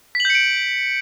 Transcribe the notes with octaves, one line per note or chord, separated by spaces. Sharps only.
G6 B6 C#7 D7 F#7